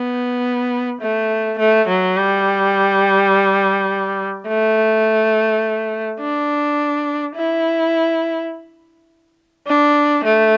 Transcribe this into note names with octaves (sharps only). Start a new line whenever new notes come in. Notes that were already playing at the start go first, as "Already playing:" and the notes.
Already playing: B3
A3
A3
F#3
G3
A3
D4
E4
D4
A3